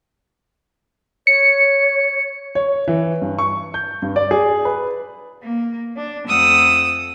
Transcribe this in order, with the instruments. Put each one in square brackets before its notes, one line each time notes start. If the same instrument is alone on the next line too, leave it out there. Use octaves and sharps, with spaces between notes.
[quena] C#5 [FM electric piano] C#7
[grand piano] C#5
E3
G2
C#6
G6
G2
D5
G#4
B4
[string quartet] A#3
D4
F2 A3 F#5 D#6 E6